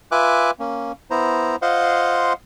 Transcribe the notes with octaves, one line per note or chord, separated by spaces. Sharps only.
F4 B4 E5 G#5 D6 F#6
A#3 C#4
B3 E4 C5 A#5
F4 C5 D#5 F5 F#5 C6